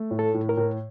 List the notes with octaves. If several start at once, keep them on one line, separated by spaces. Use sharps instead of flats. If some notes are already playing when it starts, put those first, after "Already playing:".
Already playing: A3
A2
A4
A2
A#4
A2